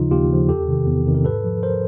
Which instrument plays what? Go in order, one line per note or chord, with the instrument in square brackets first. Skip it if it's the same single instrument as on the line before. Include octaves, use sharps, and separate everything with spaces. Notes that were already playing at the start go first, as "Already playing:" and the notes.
Already playing: [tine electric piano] D#2 C#3 F3 D#4 F4
D#2 F4 G4
C#3 F3
E2 G4 A4
C3 D#3
E2
C3 D#3
A#4
G#2 A4 B4
F3
A#4 C5